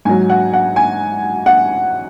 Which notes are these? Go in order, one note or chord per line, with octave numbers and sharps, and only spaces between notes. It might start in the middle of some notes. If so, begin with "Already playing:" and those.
G#2 F#3 G#5
F#5
F#5
G#5
F#5